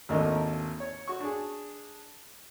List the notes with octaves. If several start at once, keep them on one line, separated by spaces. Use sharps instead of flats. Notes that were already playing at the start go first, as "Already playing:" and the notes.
G#1 D#2 A3 D4 A#4 D#5
C#5
F#4 C#6
D4 G#4